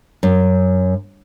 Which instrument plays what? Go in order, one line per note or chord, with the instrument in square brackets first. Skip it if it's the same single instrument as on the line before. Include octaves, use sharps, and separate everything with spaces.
[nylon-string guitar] F#2